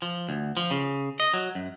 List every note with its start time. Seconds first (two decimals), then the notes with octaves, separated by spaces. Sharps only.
0.02 F3
0.29 D2
0.57 F3
0.71 C#3
1.20 D#5
1.34 F#3
1.55 F#2